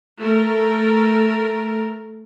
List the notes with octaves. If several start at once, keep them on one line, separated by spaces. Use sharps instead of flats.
A3 A#4